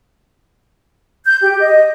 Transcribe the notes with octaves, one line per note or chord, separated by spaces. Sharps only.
G6
G4
D#5